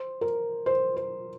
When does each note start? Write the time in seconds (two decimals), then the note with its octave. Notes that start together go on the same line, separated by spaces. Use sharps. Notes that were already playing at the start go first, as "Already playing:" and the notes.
Already playing: C5
0.21 A#4
0.66 C5
0.97 C5